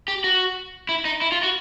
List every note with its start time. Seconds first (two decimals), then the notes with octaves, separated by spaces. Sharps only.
0.08 G4
0.24 F#4
0.89 E4
1.05 D#4
1.21 E4
1.32 F4
1.43 F#4